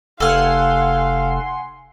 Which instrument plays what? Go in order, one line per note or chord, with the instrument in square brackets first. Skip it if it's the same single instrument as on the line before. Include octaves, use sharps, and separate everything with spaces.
[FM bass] F1 [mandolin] A4 F6 [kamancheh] F5 [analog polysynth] F#5 G#5 C6